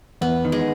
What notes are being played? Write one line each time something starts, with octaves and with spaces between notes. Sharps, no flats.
E2 B3
D#3
G#3